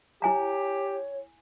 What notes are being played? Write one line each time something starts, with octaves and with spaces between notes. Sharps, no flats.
E4 G4 C#5 G#5 A#5